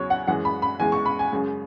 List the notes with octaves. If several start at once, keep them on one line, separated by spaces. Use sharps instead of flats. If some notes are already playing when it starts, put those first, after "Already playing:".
Already playing: E2 C#3 F#3 C#5
F#5
F#2 E3 G#3 F#5
B5
B5
E2 E3 G#3 G#5
C#6
B5
G#5
F#2 C#3 G#3